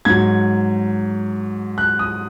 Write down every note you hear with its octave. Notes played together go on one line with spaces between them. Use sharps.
G#2 F#3 G#6
F#6
D#6